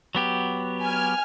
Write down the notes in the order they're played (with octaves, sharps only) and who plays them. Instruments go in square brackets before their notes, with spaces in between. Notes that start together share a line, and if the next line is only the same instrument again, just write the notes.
[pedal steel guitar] F#3 B3 G4
[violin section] G#5 F6